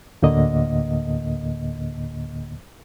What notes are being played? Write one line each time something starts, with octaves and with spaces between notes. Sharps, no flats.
D2 A2 D3 A#3 D#5